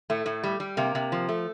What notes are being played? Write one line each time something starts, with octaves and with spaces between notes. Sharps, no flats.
A2 A3
A2
G3
G3
C3 A#3
C3
F3
A3